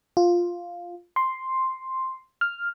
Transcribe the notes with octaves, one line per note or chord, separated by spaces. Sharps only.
F4
C6
F6